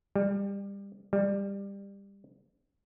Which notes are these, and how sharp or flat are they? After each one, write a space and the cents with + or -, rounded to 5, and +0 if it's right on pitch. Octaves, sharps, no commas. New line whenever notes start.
G3 +25
G3 +20